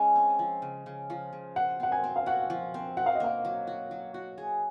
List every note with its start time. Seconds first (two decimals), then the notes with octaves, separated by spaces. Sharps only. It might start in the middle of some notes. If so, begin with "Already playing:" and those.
Already playing: G#3 C#4
0.15 C4
0.39 F3
0.62 C#3
0.86 C#3
1.10 F3
1.33 C#3
1.56 C5 F#5
1.80 C4 F#5
1.92 G#5
2.04 C4
2.16 F5
2.26 F#4 F#5
2.50 F3
2.74 C4
2.97 F#4 F#5
3.06 F5
3.15 D#5
3.20 A#3 F5
3.45 F#3
3.67 F#4
3.91 F#3
4.14 F#4
4.38 G#4